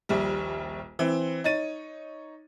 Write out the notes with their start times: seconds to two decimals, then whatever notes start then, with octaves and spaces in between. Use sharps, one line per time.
0.09 D#1 A#1 G3
0.99 E3 C4
1.44 D#4 C#5 A6 D#7